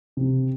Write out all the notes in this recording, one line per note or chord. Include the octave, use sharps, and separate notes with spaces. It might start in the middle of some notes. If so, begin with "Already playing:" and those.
C3